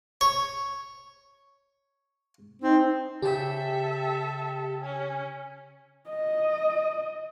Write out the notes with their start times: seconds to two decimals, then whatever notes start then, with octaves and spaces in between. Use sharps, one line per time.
0.21 C#5 C#6
2.62 C4 D#4
3.22 C#3 G4 A4 E5 G5
4.81 C#4
6.10 D#5